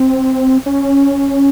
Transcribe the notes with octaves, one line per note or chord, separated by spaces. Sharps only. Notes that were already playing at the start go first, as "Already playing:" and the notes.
Already playing: C4
C#4